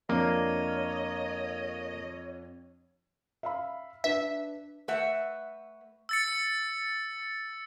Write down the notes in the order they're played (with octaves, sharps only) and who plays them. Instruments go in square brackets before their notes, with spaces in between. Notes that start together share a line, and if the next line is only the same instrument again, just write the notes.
[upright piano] F2 D4 [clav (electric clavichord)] A#3 [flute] C#5 [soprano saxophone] D#5
[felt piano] E5 F5 B5
[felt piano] D4 B4 [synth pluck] E5
[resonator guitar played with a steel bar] A3 B4 E5 F#5
[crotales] E6 A6 C#7